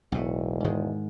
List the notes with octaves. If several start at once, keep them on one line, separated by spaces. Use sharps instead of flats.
E1 B1 A2
G#2 D#3 G#3